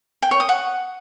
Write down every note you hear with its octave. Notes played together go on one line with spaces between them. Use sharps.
G5
C#5
D#6
F#5